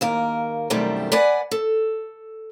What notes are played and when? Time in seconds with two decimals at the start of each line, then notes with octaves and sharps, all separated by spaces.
0.01 D#2 A#3 A#4
0.70 F#2 B2 D#3 G3 A3 C4
1.12 B4 D5 F#5 G#5
1.51 A4